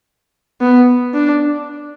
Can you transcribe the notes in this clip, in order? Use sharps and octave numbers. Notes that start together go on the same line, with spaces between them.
B3
D4